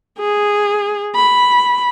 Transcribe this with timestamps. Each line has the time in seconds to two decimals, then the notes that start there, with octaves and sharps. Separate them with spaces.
0.18 G#4
1.15 B5